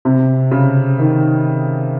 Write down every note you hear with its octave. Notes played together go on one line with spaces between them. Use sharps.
C3
C#3
D#3